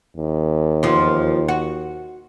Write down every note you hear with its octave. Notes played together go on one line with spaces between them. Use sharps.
D#2
E2 F3
F#4